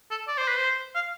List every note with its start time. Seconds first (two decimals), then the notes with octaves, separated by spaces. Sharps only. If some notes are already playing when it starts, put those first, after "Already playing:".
0.10 A4
0.28 D5
0.38 C5
0.48 B4
0.58 C5
0.95 F5